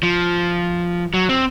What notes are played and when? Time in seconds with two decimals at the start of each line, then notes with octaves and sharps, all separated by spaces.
0.03 F3
1.14 F#3
1.29 C4